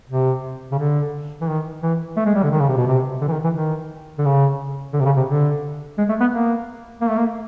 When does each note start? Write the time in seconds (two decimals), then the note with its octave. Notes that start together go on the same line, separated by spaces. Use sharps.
0.10 C3
0.72 C#3
0.79 D3
1.41 E3
1.48 D#3
1.82 E3
2.17 A3
2.26 G#3
2.35 G3
2.43 D3
2.52 D#3
2.60 C#3
2.69 C3
2.77 B2
2.86 C3
3.21 D3
3.28 E3
3.32 D#3
3.44 E3
3.55 D#3
4.18 D3
4.25 C#3
4.93 D3
5.00 C3
5.05 C#3
5.16 C3
5.28 D3
5.98 G#3
6.09 A3
6.20 B3
6.32 A#3
7.01 A#3
7.09 A3
7.18 A#3